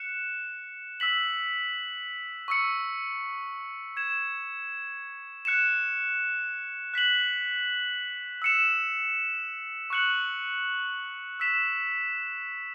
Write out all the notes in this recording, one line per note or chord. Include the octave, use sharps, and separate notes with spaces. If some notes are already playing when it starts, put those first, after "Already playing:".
Already playing: F#6 C#7 E7
E6 B6 F#7
C#6 E6 C#7
G#6 E7
F#6 C#7 E7
F#6 B6 F#7
E6 C#7 E7
C#6 F#6 C#7 F#7
E6 B6 E7